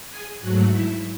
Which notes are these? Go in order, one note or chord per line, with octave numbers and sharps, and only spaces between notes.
G#4 G#5
G#2 F#3 A3 F#4 F#5
E4 E5